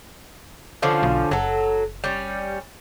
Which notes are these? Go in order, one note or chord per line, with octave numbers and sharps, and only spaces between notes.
D3 F3 C#4
B1
F#1 F#3 A4
G3 C#4